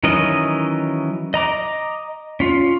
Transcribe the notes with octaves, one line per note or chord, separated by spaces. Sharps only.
D#3 E3 F#3 C#4 D#5
D#5 A#5 D6
C#4 F4